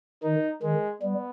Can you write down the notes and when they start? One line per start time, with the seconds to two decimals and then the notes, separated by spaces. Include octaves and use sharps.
0.23 D#3 D#4
0.62 D#3 G#3
1.02 G3 B3